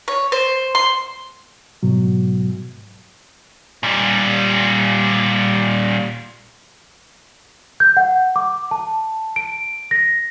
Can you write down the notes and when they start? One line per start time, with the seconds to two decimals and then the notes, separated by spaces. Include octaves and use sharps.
0.08 C#5
0.32 C5
0.75 C6
1.83 G#2 B2 F#3
3.83 A#2 G3
7.80 G6
7.97 F#5
8.36 D6
8.71 A5
9.36 D7
9.91 A#6